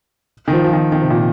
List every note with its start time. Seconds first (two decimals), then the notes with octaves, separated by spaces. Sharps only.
0.48 D#3
0.53 F3
0.64 F3
0.73 D#3
0.92 D#3
1.01 C3
1.10 A#2